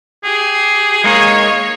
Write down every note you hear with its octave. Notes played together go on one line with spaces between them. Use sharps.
G4 G#4
G#3 A#3 D#4 C#5